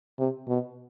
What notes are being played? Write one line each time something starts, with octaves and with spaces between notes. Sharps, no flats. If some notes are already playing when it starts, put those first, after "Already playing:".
C3
B2